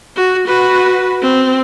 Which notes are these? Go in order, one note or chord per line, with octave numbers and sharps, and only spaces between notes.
F#4
F#4 B4
C4